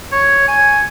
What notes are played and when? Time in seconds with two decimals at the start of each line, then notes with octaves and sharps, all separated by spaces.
0.12 C#5
0.48 G#5